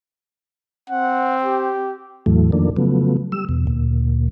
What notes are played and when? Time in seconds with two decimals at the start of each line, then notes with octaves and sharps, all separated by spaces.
0.90 C4 F#5
1.44 G4
2.26 E2 A2 E3 F#3 A3
2.52 F2 D#3 F3 A3 A#3 D4
2.76 C#3 F3 F#3 A3 B3
3.32 G3 E6
3.49 E2 B2
3.67 D2 A#2